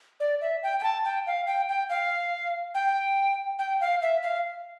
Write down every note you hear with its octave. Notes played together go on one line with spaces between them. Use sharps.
D5
E5
G5
G5
A5
G5
F5
G5
G5
F5
G5
G5
F5
E5
F5